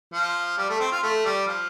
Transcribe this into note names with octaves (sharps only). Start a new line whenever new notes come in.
F3
G3
A3
C4
F4
A3
G3
F3